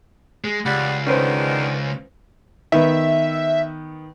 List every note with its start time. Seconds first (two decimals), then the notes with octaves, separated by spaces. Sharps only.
0.44 G#3
0.66 C#2 G3 F#5
1.06 G#2 D3 D#3 C#4 B4 C5
2.72 D#3 B3 E5